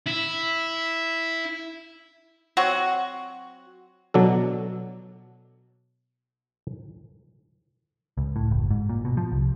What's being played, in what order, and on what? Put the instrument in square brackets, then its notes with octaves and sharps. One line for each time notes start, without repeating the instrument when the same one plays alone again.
[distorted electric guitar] E4
[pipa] F#3 C4 F#4
[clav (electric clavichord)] B2 F#3 D4 A4
[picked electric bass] C#2
A2
F#1
G#2
A#2
B2
F3
C2